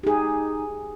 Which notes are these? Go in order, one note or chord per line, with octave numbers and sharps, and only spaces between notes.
D#4 G4 G#4